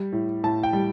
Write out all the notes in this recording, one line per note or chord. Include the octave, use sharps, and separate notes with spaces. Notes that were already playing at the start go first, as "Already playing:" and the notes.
Already playing: G3
A2
A2 A5
G5
G3